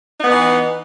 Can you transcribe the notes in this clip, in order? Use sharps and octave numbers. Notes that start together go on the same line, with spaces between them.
E3 B3 D#4